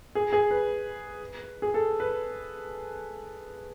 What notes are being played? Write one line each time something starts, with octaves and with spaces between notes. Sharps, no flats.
G#4
G#4
B4
G#4
A4
B4